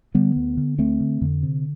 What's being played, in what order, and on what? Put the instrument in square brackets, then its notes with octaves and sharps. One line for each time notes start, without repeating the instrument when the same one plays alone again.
[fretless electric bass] D3 G3 B3
D2
D3
D2 A3 C4
D3
F2 D3
C3